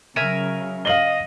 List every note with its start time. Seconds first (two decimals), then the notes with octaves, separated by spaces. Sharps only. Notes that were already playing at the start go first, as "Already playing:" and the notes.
0.16 C#3 F#3 A#4 E5 G#5
0.85 D#5 F5 F#7 G7